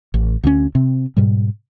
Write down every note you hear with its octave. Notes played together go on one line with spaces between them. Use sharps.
A1
D2 A#3 C#4
C3 C4
G#2 B2 G3